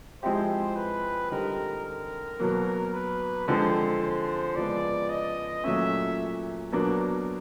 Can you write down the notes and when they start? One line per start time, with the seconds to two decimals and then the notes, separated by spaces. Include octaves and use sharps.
0.22 F3 G#3 C4 E4 G4 C5
0.76 B4
1.31 D3 G3 C4 D#4 G4 A#4
1.85 A#4
2.40 B2 F#3 A#3
2.93 B4
3.48 D3 F3 G#3 C4 C5
4.02 C5
4.56 C#3 F3 G#3 B3 D5
5.09 D#5
5.64 A#2 F#3 A3 C#4 E5
6.72 B2 F#3 A#3 D4